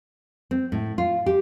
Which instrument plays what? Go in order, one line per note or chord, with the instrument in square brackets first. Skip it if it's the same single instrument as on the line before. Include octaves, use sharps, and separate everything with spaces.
[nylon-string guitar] C4
A2
F4
G4